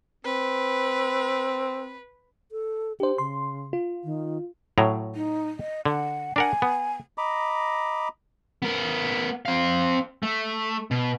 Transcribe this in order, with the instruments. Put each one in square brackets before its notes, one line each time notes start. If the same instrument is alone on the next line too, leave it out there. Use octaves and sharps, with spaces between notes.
[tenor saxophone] C4 [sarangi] B4
[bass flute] A4
[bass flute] D4 [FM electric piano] G4 C5
[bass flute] C#3 [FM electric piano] C6
[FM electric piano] F4
[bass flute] D#3
[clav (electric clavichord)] A2 F#3 A#5
[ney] D#4
D#5
[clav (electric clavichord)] D3 [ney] F#5
[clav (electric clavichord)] D4 A#4 F#5 [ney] G#5
[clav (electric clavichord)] B3
[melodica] D#5 A#5 B5 D6
[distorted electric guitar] B3 A#4
C4 F5
A3
B2